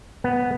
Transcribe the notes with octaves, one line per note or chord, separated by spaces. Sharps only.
B3